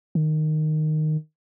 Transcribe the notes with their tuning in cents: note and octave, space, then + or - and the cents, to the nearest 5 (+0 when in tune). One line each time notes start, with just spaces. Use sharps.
D#3 -10